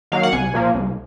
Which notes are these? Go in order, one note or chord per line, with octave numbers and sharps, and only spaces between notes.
D#3 F#3 A#3 F5
F#5
C2 G#5
A#2 F3 A#3
C2